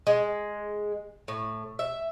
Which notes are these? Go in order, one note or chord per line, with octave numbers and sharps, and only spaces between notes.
G#3
A2
E5